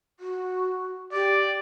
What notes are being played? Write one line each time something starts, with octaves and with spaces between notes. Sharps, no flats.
F#4
G4 D5